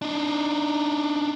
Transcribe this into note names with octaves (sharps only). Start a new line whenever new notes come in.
D4 D#4